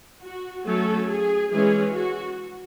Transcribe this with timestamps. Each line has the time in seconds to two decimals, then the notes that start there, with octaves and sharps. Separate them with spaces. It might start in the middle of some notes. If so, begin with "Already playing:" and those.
0.21 F#4
0.65 F#3 A3 C#4 A4
1.09 G#4
1.52 E3 G#3 C#4 G#4
1.94 F#4